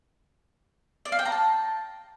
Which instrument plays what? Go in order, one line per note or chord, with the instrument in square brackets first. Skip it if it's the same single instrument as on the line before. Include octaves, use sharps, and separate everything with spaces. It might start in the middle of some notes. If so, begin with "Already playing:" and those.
[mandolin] D5
F5
G5
A#5
A5